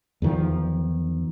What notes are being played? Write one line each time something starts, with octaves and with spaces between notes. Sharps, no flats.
E2 D#3 F3